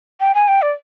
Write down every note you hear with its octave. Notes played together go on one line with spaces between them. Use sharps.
G5
G#5
G5
D5